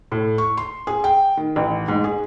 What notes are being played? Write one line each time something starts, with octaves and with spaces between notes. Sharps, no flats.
A2
C#6
C6
G#4
G5
D#3
A1
G#2
G#4